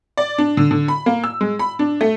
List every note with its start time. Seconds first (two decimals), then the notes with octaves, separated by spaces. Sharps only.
0.17 D5
0.38 D4
0.57 D3
0.71 D3
0.88 B5
1.06 A#3
1.24 E6
1.41 G#3
1.59 B5
1.79 D4
2.01 A3